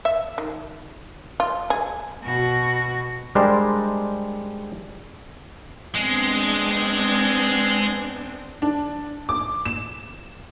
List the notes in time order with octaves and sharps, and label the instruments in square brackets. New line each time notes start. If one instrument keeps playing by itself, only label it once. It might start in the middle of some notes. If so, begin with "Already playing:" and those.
[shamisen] E5
D#3
F4
G#4
[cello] B2 F#4
[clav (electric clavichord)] G3 G#3 D4 G4 A#4 C5
[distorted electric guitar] G#3 [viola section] B3 C4 D4
[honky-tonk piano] D4
D6
E7